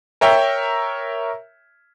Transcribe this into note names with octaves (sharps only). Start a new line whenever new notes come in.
A#4 C#5 E5 G5